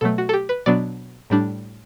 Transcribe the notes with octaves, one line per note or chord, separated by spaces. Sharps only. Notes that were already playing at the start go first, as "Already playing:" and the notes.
B2 F#3 A3 A4
F#4
A4
G4
B4
B2 F#3 B3 D4 D5
A2 G3 D4